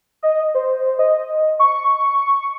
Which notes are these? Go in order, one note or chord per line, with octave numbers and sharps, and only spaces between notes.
D#5
C5
D#5
C#6